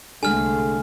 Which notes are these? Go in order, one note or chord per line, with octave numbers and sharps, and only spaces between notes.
C2 D3 G#3 A3 G#4 A4 G#5 F6